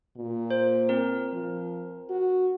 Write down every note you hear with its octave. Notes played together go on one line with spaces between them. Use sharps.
A#2
C5
C4 A#4
F3
F#4